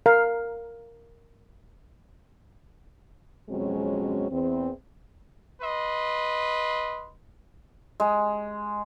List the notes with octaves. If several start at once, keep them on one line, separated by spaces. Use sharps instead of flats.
A#4 F5
F2 B2 F#3 G#3 C4 C#4
E2 C4
B4 D#5 C6
G#3